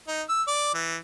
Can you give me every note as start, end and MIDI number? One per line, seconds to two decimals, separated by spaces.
0.08 0.22 63
0.29 0.43 88
0.48 0.71 74
0.74 0.96 52